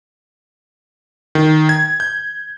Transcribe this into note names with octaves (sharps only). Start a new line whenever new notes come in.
D#3
G#6
G6